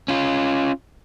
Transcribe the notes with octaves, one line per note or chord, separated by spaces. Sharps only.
C#4 F4